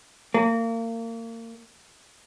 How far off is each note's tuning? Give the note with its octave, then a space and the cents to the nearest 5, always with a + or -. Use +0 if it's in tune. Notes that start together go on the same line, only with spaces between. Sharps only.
A#3 -30